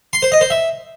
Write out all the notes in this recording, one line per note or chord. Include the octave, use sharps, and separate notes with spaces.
C6
C5
D#5
C5
E5